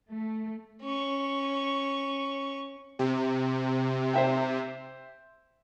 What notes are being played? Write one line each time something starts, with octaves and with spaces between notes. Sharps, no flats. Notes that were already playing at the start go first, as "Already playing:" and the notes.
A3
C#4 C#6
C3
C5 E5 G5